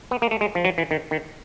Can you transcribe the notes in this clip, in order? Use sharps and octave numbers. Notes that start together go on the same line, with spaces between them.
B3
A#3
A3
G#3
F3
F#3
E3
D#3
D#3